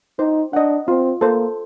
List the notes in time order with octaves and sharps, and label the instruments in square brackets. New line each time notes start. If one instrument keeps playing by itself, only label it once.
[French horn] D#4 [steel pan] C5
[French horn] D4 [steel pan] D#5 F#5
[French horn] C4 [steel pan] F4
[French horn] A#3 [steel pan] A4 C5